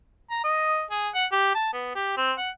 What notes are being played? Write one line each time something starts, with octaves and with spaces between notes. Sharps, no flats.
A#5
D#5
G#4
F#5
G4
A5
B3
G4
C4
F#5